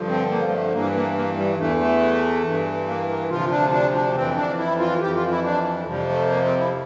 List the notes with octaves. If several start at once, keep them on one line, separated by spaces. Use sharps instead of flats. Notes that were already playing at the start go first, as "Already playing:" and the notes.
Already playing: G2 D3 F3
C4
A#3
G3
A3
G2 E3 A#3
A#3
A#3
G3
E2 E3 A3
A3
G2 E3
A#3
A#3
D2 C3 F3 F4
D4
D4
D4
F2 E3 C4
D4
E4
F4
F2 E3 G4
F4
E4
D4
F2 C3 F3 G3
A3
A#3
C4
E4